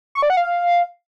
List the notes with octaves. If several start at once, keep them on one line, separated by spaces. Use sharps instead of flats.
C#6
D5
F#5
F5